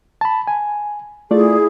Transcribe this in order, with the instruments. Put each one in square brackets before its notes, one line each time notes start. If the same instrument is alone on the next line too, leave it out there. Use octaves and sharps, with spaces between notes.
[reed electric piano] A5 B5
G#5
[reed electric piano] A3 F4 D5 [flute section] E4 G#4